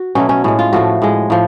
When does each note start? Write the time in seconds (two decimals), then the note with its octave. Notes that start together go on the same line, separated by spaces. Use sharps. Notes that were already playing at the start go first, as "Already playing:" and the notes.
Already playing: F#4
0.15 B2 F#3 A3 C#4
0.29 C#4
0.44 A2 G#3 C#4
0.59 F4
0.73 A2 F3 A3 F#4
1.02 A2 G#3
1.30 A2 F3